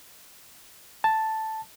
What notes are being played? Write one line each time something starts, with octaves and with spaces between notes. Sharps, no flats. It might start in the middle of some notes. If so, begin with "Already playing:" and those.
A5